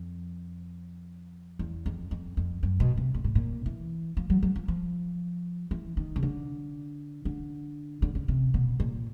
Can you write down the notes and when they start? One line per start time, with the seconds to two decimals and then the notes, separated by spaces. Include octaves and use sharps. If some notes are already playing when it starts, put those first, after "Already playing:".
Already playing: F2
1.59 E2
1.86 F2
2.11 F2
2.37 F2
2.63 F#2
2.80 B2
2.97 C3
3.14 A#2
3.24 A2
3.35 A#2
3.66 E3
4.17 F3
4.30 F#3
4.43 F#3
4.56 F3
4.68 F3
5.71 E3
5.97 D#3
6.16 C#3
6.23 D3
7.25 D3
8.02 D3
8.15 C#3
8.28 C3
8.54 B2
8.80 A#2